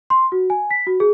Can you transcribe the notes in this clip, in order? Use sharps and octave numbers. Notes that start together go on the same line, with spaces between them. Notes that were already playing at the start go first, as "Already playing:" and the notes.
C6
F#4
G#5
B6
F#4
G#4